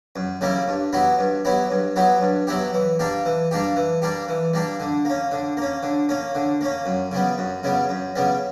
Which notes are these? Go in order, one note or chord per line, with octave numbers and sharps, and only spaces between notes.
F#2
C#3 G3 A#3 E4
G2
F#3 B3 E4 G4
G2
F#3 B3 E4 G4
G2
F#3 B3 E4 G4
G2
F#3 B3 E4 G4
E3
G3 A#3 D4 G4
E3
G3 A#3 D4 G4
E3
G3 A#3 D4 G4
E3
G3 A#3 D4 G4
D3
A#3 C#4
D3
A#3 C#4
D3
A#3 C#4
D3
A#3 C#4
F#2
C#3 G3 B3
F#2
C#3 G3 B3
F#2
C#3 G3 B3